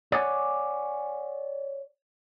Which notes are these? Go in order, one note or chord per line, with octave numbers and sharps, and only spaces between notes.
C#5 D5 F#5 G#5